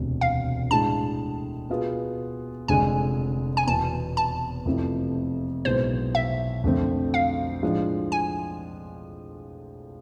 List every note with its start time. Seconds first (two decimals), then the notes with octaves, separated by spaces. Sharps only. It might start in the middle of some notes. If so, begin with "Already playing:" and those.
Already playing: E1 D2 C3
0.21 F5
0.71 A2 G#3 D4 A5
1.70 B2 B3 F4 G#4
2.68 F1 F2 D3 G#3 D4 G#5
3.57 G#5
3.67 E2 B2 B3 A5
4.17 A5
4.66 F2 C3 F3 A3 E4
5.65 B1 A2 G#3 B3 C5
6.15 E5
6.64 F2 D3 A3 C4
7.14 F5
7.63 A2 F3 G#3 D4 F4
8.12 G#5